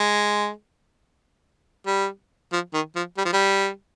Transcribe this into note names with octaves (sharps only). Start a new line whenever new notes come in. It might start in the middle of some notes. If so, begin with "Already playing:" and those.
Already playing: G#3
G3
F3
D#3
F3
G3
F3
G3